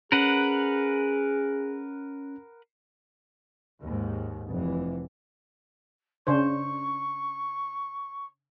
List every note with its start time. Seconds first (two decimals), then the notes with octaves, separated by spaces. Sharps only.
0.12 C#4 G#4 A#4 B4 F#5
3.82 D#2 G#2
4.49 F1 E3
6.27 C#3 D4 C5 C#6